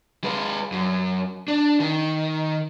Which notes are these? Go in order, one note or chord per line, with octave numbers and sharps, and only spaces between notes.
G#3 B4
F#2
D4
D#3